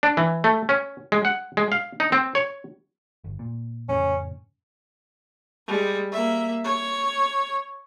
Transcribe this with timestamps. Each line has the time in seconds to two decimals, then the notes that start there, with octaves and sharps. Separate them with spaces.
0.03 D4
0.17 E3
0.44 A3
0.69 C#4
1.12 G#3
1.25 F#5
1.57 G#3
1.72 F5
2.00 D#4
2.12 C4
2.35 C#5
3.24 G1
3.39 A#2
3.89 F2 A2 C#3 C#4
5.67 G3 G#3
6.12 A#3 E5
6.64 C#5